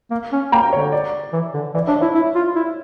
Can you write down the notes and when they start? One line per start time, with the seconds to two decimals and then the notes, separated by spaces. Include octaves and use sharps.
0.11 A#3
0.32 C#4
0.52 A#3 G5 A#5
0.73 D3 C#5
0.92 D5
1.33 E3
1.54 D3
1.74 E3 D5
1.87 D4 C#5 E5
2.01 E4 C#5 E5
2.15 E4
2.35 F4
2.56 E4